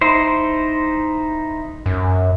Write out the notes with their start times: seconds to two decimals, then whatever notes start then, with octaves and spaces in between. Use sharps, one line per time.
0.01 D#4 E4 C5
1.86 F#2